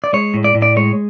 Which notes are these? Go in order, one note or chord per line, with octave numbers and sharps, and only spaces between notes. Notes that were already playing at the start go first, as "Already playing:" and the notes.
D5
G#3 C#5
A2
D5
A2
D5
G#3 C#5